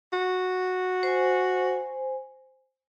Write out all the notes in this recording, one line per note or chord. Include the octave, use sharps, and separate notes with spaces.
F#4
C5 G#5